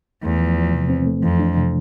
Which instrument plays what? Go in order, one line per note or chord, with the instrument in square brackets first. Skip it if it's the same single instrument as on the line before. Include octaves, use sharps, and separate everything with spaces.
[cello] E2 [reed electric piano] A3
[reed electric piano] F3
F3
C3
C4
A3
[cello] F2 [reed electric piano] E3
[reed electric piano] D4
C3